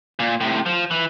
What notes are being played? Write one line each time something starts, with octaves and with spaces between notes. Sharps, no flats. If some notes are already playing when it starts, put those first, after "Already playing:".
A#2
A2 C3
F3
E3